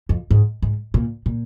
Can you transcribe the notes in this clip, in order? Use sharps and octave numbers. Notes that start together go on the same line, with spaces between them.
F2
G#2
G#2
A#2
A#2